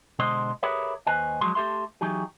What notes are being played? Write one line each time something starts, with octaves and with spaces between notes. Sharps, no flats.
B2 D3 G#3 C5 D#5 C6
G4 G#4 A#4 B4 C#5 E5
D#2 B4 C5 D#5 G#5
F3 F#3 G#3 C6
A3 G4 A4 E5 C6
E3 F#3 D#4 G4 G#4